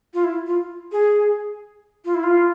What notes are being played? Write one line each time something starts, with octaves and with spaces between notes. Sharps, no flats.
F4
E4
F4
G#4
F4
E4
F4